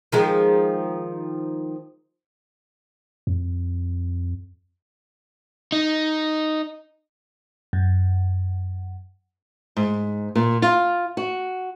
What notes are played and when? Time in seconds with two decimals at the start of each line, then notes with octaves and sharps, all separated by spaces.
0.12 D#3 F3 G#3
3.27 F2
5.72 D#4
7.73 F#2
9.77 G#2
10.35 A#2
10.62 F4
11.17 F#4